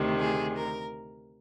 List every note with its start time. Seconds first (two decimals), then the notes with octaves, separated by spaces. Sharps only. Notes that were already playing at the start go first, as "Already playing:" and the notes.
Already playing: D2 C3 D#3
0.19 G#4
0.56 A#4